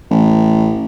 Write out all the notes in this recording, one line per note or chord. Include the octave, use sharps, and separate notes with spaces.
A1